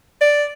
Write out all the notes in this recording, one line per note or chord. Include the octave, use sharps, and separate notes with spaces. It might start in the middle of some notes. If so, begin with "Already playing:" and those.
D5